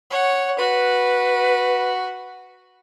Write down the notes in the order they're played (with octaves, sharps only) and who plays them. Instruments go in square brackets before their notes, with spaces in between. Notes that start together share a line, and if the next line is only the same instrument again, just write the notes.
[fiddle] C#5 F#5
[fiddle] F#4 [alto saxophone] B4